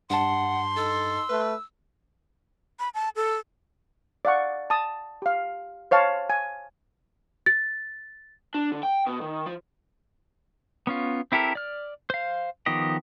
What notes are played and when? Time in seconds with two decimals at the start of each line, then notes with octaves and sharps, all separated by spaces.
0.10 G2 F#5 A5 C6
0.77 D#4 A4 E6
1.29 A3 B4
2.79 B5
2.94 A5
3.16 A4
4.25 D5 F5 F#5 C#6
4.70 A5 D#6
5.22 G4 F5
5.91 C5 C#5 F5 A5
6.30 G#5
7.46 A6
8.54 D4
8.72 D3
8.83 G5
9.07 B2
9.21 D#3
9.46 F3
10.87 B3 C#4 F4
11.32 C4 E4 G4 A4 A#4
11.55 D5 F6
12.10 C5 F5
12.66 D#3 F3 B3 G4 D#5